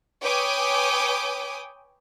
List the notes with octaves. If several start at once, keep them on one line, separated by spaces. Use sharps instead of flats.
B4 C#5 G5 G#5 D6 D#6